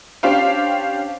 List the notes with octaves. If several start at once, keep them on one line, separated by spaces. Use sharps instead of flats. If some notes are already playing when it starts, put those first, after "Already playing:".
C#4 D4 G4 C5 F5 G5